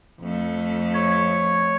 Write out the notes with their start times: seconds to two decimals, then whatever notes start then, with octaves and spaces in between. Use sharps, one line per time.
0.20 F2 A3
0.95 C#5